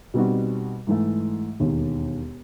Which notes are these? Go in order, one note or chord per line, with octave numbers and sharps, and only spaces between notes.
B2 G3 C4 D#4 F#4
G#2 E3 A3
E1 D#2 D#3